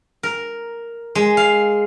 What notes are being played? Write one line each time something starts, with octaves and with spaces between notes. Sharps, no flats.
A#4
G#3
F5